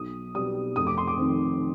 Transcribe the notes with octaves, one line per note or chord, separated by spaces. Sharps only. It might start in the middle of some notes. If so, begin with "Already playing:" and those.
Already playing: B1 D#6
B2 G3 D#6
F1 D#6
D6
C6
D6
F2 D#3